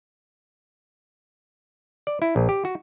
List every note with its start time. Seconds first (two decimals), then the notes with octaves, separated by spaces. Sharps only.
2.07 D5
2.22 E4
2.36 A#1
2.49 G4
2.65 F#4